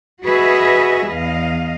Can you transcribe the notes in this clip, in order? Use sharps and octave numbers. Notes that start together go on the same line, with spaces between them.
F#4 G#4 B4 D#5 E5
E2 D#5 F5